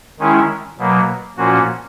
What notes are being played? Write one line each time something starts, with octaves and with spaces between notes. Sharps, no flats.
D#3 G#3 C#4 E4
B2 F#3 A#3
A#2 F3 A#3 C#4 F#4